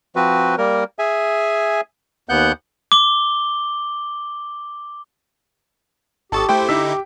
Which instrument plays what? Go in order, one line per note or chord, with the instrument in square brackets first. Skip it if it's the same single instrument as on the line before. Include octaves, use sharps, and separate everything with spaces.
[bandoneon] F3 C4 F#4 B4
G3 A#3 A#4
G#4 E5 G#5
D#2 B3 F#5 F#6 G6
[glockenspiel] D6 G7
[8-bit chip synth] G#1 A4 A6 [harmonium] G4 [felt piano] A5 C#6 D#6
[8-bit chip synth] A3 E4 C5 [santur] G5
[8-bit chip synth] D3 D#4 E4 [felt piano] D6 E6 B6